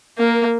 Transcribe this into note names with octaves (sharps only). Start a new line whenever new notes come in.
A#3 A#4